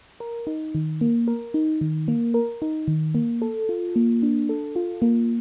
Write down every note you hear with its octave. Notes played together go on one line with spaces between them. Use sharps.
A#4
D#4
D#3
A#3
A#4
D#4
D#3
A#3
A#4
D#4
D#3
A#3
A4
F4
A#3
D4
A4
F4
A#3